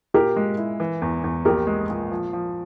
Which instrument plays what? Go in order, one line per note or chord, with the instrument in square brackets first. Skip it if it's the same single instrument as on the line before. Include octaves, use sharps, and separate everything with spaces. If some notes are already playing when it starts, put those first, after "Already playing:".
[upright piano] A#2 [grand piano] G4 A#4
[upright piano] G#3
E4
E3
E2
E2
[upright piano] A#1 [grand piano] G4 A#4
[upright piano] G#3
A#2
F3
F3